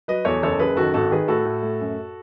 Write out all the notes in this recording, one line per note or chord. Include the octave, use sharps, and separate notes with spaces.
F#3 B4 D#5
E2 A4 C#5
F#1 A4 C#5
F#1 G#4 B4
D#3 F#4 A4
G#1 F#4 A4
D#3 G#4 B4
A2 F#4 A4
A2
A3
F#2